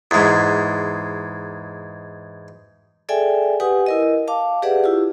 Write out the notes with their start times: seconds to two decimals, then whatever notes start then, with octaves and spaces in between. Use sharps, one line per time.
0.11 E2 G#2
3.09 G#4 A4 D5 E5 G5 G#5
3.60 G4 B4 F#5 G#5 D#6
3.86 E4 A#4 D#5
4.28 F5 A5 D6
4.62 G4 G#4 B4 D5 E5 F#5
4.84 E4 F4 G4